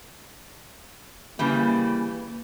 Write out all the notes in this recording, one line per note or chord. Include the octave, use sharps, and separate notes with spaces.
C#3 E3 G3 A#3